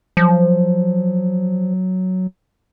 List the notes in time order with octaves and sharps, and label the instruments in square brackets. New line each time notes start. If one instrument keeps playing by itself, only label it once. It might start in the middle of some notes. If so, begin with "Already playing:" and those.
[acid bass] F3 [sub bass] F#3